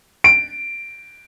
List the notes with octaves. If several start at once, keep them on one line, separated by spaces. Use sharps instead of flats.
D7